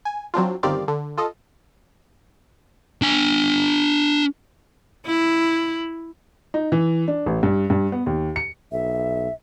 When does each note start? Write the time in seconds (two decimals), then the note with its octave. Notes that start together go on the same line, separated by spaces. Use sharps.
0.05 G#5
0.34 F#3 C4 D4 F4
0.63 G1 D#3 C4 G4 D5 F5
0.88 D3
1.17 F4 A4 D#5
3.02 D4 G#5
5.06 E4
6.54 D#4
6.72 E3
7.08 D4
7.26 A1
7.43 G2
7.70 G2
7.92 B3
8.06 D#2
8.36 C#7
8.72 B1 E5